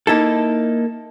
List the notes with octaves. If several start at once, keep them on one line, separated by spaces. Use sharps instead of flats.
A#3 D#4 E4 A4